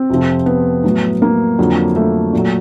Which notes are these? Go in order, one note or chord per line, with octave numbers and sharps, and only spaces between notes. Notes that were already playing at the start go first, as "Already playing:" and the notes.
Already playing: C4
F2 C3 F3
B3
A2 F#3
A#3
F2 D3 F#3
A3
A#2 F#3